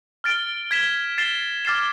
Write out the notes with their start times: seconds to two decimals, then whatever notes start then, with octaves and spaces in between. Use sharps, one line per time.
0.24 F6 A6 D7 G7
0.71 G#6 B6 E7 G7
1.18 A6 C7 E7 G7
1.65 D6 F6 A6 C7 E7